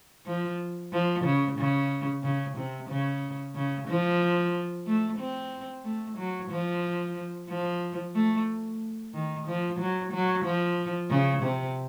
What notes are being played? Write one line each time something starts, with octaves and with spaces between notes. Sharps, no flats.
F3
F3
C#3
C#3
C#3
C3
C#3
C#3
F3
A3
C4
A3
F#3
F3
F3
A3
D#3
F3
F#3
F#3
F3
C#3
C3